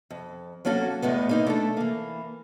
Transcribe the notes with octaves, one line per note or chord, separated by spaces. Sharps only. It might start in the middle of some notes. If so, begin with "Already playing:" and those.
F2
F#3 A#3 C#4 F#4 A4
E2 A2 G#3 B3
A#3 D#4 E4
A3 D4 A4
E3 A#3